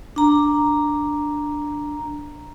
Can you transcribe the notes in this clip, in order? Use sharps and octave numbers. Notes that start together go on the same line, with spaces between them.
D4 A#5